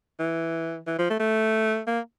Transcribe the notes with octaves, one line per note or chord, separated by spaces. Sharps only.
E3
E3
F3
A3
A3
A#3